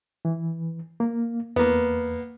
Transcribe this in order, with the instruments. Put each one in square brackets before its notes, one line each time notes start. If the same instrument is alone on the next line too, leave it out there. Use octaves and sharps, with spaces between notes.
[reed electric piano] E3
A#3
[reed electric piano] E2 [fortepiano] A#3 B3